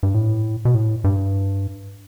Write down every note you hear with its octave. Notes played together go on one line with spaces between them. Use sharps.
G2
A2
B2
A2
G2